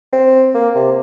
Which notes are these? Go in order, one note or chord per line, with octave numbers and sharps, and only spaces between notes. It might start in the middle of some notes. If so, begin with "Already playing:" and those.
C4
A#3
C3